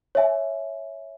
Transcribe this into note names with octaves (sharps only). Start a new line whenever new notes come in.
C#5 E5 G#5